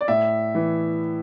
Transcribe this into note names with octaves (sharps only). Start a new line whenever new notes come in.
D5
A2 E5
E3